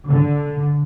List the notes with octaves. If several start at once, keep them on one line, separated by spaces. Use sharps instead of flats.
D3